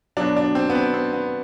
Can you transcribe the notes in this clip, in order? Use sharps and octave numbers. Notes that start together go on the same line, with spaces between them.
B2 F#3 D4
D4
C4
B3
C4
C4
B3